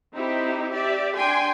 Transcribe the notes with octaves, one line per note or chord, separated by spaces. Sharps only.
C4 D#4 E4 G4
G4 D5 E5
D4 G5 G#5 C6